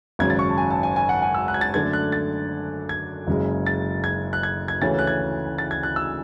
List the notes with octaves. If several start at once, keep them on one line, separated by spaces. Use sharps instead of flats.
G#1 F#2 C#3 G#6
A6
C#6
A5
G#5
A5
G#5
G#5
F#5
G#5
E6
F#6
G#6
A6
F#2 D3 A3 D4 G#6
F#6
A6
G#6
F#1 F#2 C#3 G#3
A6
G#6
F#6
G#6
G#6
D2 C#3 E3 A3 C#4 A6
F#6
G#6
A6
G#6
F#6
E6